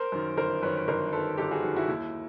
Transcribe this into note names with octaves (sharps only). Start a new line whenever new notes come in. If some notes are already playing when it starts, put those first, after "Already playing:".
Already playing: A#4 C5
F#2 D#3
G1 A#4 C5
F#2 D#3 B4 C#5
B4
G1 A#4 C5
F#2 D#3 A4 B4
G1 G4 A4
F#4 G#4
F#2 D#3
E4 F#4
D#2 E4